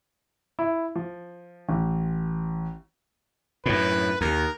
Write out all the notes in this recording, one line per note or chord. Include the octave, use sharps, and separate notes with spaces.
E4
F3
A1
F#2 A2 B4
D#2 A#4